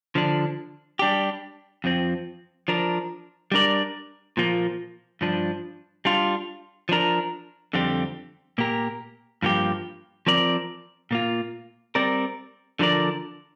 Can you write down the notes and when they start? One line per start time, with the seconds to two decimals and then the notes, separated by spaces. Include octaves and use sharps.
0.15 D3 F3 D4
0.99 G3 D4 G4
1.84 F2 F3 C4
2.68 F3 D4 A#4
3.52 G3 D4 A#4 D5
4.37 A#2 F3 A#3
5.21 G2 F3 D4
6.05 G3 D4 F4
6.89 F3 D4 A#4
7.73 F2 D3 G3 C4 G4
8.58 A#2 A#3 G4 A#4
9.42 G2 F3 A#3 G4
10.27 F3 C4 A#4 D5
11.11 A#2 A#3 F4
11.95 G3 C4 A#4 D5
12.79 D3 F3 D4 A#4 D5